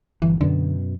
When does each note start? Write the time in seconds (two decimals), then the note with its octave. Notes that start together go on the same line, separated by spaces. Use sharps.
0.22 G1 E3
0.41 F#2 B2 D3 B3